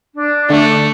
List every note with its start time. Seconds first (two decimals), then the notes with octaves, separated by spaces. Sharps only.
0.16 D4
0.50 D3 A3